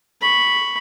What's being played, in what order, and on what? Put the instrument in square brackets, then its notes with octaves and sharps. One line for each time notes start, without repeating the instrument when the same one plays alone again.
[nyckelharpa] B5 C#6